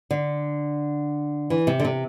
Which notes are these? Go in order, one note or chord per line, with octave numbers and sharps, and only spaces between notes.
D3
E3
C3
D3
C3